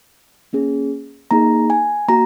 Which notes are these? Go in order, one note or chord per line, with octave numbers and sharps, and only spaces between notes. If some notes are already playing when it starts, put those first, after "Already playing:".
A#3 C#4 G#4
A#3 D#4 G#4 A#5
G#5
A#3 F#4 A#5